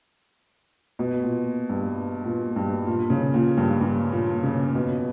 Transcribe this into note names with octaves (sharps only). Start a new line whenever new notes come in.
B2
A#2
G2
A#2
G2
A#2
C#3
A#2
G2
G2
A#2
C#3
B2